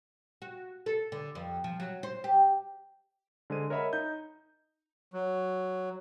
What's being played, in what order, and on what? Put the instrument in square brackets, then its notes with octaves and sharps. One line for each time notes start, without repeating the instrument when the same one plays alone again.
[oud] F#4
A4
D3
F2
F3
F#3
C5
G4
[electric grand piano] D3 G#3 C5 D#7
A#4 C#5 D#5 E5 F#5 B5
D#4 G6
[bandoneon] F#3